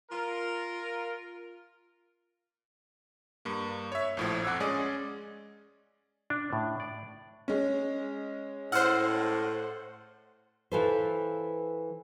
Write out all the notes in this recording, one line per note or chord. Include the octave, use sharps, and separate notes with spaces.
F4 A#4
G2 A#3
C#5 E5
A#1 A2 F3
F2 F#5 D6 E6 G#6
G#3 C#4 G#4 D5 D#5
D4
A2
D5
G#3 C#4
A2 C5 F#5 E6 F6
E3 F4 A4 B4 C5